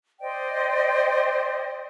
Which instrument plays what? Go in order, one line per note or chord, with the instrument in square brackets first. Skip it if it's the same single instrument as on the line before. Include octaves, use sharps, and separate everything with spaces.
[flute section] C5 D5 D#5 G5